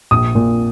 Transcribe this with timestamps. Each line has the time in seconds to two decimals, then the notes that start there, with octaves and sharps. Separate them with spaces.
0.11 A#1 D#6
0.35 A#2